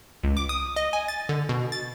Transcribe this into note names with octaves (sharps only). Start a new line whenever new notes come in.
C#2
D6
D#6
D#5
G#5
A6
D3
B2
A6